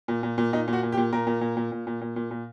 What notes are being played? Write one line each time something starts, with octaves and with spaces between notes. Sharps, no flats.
A#2
A#2
A#2
A#2 D#4
A#2
F#4
A#2
G4
A#2
A#2 A#4
A#2
A#2
A#2
A#2
A#2
A#2
A#2
A#2